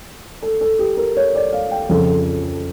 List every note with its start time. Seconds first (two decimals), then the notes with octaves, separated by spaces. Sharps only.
0.42 A4
0.61 A4
0.79 G4
0.97 A#4
1.17 C#5
1.35 D5
1.53 F5
1.71 G5
1.89 F2 C#3 F3 A4